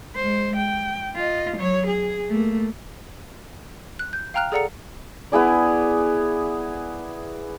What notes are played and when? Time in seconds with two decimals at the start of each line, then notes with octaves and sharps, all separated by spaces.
0.16 G#3 C5
0.56 G5
1.16 F4 D#5
1.58 F#3 C#5
1.87 G#4
2.29 A3 A#3
3.99 F#6
4.13 G6
4.34 F5 G5 A#5 F6 F#6 F7
4.52 G#4 A4 D5 F#5 A#5 C#7
5.32 B3 E4 G#4 D5